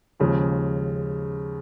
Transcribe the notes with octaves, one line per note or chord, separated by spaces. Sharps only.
D#2 C#3 F3 G#3